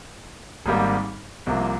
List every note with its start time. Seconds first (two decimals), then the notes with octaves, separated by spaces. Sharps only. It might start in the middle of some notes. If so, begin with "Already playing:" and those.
0.66 G#1 G#2 G3 A#3
1.46 C2 C3 F3 A#3